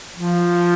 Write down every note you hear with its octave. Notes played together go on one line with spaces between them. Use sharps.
F3